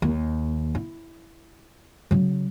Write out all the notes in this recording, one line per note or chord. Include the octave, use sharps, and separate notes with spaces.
D#2
E4
C#3 F#3